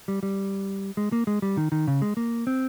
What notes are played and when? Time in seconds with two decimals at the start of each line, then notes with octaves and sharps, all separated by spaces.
0.08 G3
0.23 G3
0.97 G#3
1.12 A#3
1.27 G#3
1.42 G3
1.57 D#3
1.72 D#3
1.87 C#3
2.02 G#3
2.17 A#3
2.47 C4